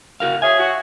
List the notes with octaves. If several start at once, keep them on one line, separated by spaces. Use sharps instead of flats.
F#4 A#4 F5
G#4 C#5 E5 G#5
F#4